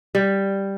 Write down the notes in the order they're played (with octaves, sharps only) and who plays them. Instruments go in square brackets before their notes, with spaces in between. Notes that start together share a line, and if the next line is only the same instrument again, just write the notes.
[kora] G3